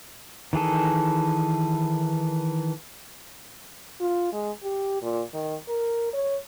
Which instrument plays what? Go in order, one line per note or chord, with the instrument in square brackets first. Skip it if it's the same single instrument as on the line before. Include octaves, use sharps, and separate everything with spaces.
[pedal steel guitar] D#3 E3 G#4 A4
[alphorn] F4
G#3
G4
A#2
D#3
A#4
C#5